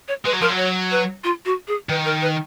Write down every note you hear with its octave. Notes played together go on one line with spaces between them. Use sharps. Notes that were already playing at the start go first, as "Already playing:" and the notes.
C#5
G#3 B4
F#3
F3 A#4
F#3
C#5
B4
F4
F#4
G#4
D#3 B4
A#4
B4